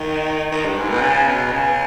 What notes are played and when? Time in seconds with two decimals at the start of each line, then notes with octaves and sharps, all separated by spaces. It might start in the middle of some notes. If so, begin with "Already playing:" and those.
Already playing: D#3
0.52 D#3
0.65 G2
0.77 G#2
0.89 B2
1.02 C#3
1.27 B2
1.52 C#3